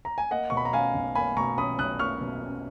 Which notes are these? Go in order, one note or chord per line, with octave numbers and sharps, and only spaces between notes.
A#5
G#5
A#3 D#5 F#5
B2 C#6
B5
A#5
C#4 F5 G#5
B1
A#3 G#5 B5
B2 A#5 C#6
C#4 B5 D#6
B1 D#6 F#6
A#3 C#6 F6
B2
C#4